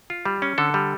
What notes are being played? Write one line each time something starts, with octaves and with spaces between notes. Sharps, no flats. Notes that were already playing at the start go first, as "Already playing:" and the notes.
F4
G3
C#4
D3 A4
G3